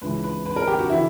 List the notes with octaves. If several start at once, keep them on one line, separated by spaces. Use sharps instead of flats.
C#2 C#3 E3 B4
B4
B4
A#4
G4
F#4
C#3 E3 E4